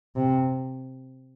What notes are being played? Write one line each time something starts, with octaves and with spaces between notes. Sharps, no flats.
C3